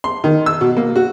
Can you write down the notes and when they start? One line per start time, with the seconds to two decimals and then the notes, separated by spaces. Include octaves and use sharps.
0.04 C6
0.24 D#3
0.46 E6
0.61 B2
0.77 A#3
0.96 F#4